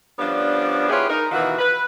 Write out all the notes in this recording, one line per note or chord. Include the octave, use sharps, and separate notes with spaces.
F3 G3 B3 C#4 D4
B3 E4 F4 G4 G#4 C#5
D#4 A#4
B2 D#3 E3 F4 F#4
B4